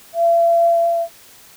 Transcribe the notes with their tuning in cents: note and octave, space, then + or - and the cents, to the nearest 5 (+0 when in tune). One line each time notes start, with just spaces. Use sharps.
E5 +45